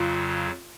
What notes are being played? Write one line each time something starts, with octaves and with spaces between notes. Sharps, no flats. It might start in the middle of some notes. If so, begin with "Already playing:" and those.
Already playing: F2 C#3 F#3 F4